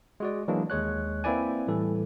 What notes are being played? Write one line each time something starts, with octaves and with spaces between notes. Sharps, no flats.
G#3 F#4 D5
E3 F#3 G#3 A#3 D4
D#2 G#3 C#5 F#6
A#3 C4 E4 B4 D5 G#5
A2 E3 G3 A4